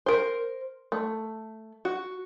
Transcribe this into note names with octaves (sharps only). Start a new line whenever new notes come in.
A#4 C5
A3
F#4